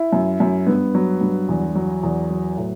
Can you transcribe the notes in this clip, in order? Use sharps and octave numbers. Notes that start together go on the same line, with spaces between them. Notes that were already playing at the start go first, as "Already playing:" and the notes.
Already playing: E4
F#2
F#2
G2 B3
F#3
G2
E2
F#3
E2
F#3
A2